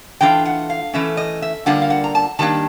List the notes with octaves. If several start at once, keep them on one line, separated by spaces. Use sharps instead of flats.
E3 A3 D4 F4 G5
F#5
F5
E3 A3 C#4 E5
D#5
E5
D3 G3 A#3 D4 F4 F#5
F5
F#5
A#5
A5
D#3 G3 A#3 D4 A5